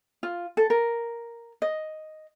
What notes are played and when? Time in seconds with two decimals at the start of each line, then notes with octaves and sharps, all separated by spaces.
0.23 F4
0.57 A4
0.70 A#4
1.62 D#5